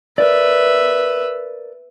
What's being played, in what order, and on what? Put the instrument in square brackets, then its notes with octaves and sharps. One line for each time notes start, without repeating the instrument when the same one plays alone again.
[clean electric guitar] A#4 D5 [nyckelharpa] B4 E5